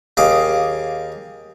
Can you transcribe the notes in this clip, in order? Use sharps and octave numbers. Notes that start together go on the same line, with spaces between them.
D#2 G#4 F5 D6